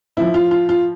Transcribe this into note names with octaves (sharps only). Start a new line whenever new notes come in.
A2 F3 E4
F4
F4
F4